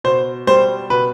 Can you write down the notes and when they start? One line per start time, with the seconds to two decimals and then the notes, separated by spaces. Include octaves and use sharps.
0.04 B2 C5
0.47 G3 C5
0.90 B2 B4